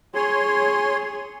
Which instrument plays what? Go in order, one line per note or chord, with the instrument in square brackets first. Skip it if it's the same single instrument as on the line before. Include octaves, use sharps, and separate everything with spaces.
[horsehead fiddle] G#4 [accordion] C#5 C6